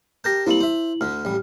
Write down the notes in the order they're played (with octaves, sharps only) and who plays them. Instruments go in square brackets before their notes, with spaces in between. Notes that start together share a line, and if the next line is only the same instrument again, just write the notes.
[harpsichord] G4 A#4 A5 [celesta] G6 A#6
[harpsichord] G3 A#3 C4 [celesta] E4 F#7
[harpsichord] C5 E5
[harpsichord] D2 D3 [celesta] F6
[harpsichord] A1 G3